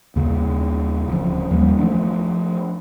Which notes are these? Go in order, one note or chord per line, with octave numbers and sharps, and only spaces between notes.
D#2 C#3
D1 F3
D#2 G3
F3 F#3 A3 D4